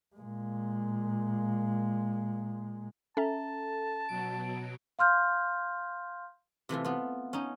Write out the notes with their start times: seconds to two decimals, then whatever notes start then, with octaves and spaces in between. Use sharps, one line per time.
0.16 A#2 G#3
3.17 C#4 A4 E5 A5 A#5
4.09 B2 F#3 D7
4.99 F5 C6 F6 G6
6.69 C3 E3 A3 F4
6.84 B3 F4
7.33 C#4 D#4